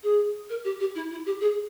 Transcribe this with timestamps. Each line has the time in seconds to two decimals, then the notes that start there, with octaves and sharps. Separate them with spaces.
0.03 G#4
0.50 A#4
0.64 G4
0.80 G4
0.95 E4
1.11 E4
1.26 G4
1.41 G#4